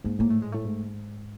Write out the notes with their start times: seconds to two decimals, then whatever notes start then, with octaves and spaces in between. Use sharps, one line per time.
0.04 G#2 A#3
0.19 A2 A#3
0.30 A3
0.42 G#3
0.52 A2 A3
0.65 G#2